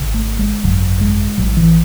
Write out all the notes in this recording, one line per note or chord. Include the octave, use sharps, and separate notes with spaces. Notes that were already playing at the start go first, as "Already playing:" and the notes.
Already playing: G#1 C#3
A3
G#3
G#1 F#2 C#3 F#3
G#3
A1 A2 F#3
E3